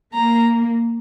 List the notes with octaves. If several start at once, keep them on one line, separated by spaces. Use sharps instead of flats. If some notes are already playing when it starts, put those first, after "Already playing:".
A#3 A#5